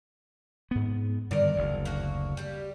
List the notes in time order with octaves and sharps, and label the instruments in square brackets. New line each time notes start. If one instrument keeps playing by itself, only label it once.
[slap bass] G#2 B3
[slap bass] G2 D3 D#3 [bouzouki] A#4 D5
[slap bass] F#1 D2
[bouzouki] A#3 F#4
G3 G4